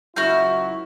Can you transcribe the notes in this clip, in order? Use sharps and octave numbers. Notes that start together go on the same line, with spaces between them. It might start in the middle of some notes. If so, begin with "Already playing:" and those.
C#2 F#3 E4 F#4 F6 G6